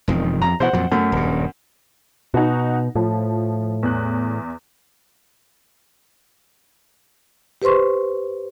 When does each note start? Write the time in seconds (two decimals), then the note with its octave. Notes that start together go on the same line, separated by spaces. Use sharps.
0.08 E1 F2 D#3
0.42 F2 A#5
0.60 B2 E3 C5 F#5
0.73 F2 A#2 F#3
0.92 F#2 A3
1.12 D#1 G2
2.34 B2 D#4 F#4
2.95 A2 F3
3.83 E2 F#6
7.62 G4 B4 C5 C6 C#6